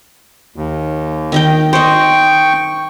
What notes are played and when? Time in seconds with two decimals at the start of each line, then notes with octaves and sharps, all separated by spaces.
0.56 D#2
1.32 D#3 D#4 G5
1.73 C5 D#5 G5 C#6